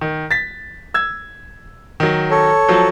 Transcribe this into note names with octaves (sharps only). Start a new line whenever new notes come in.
D#3
A6 B6
E6 G#6
D#3 F#3
A4 C#5
F3 F#3